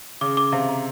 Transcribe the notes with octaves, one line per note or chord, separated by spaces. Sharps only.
C#3 D6
D6
C3 F5
A#5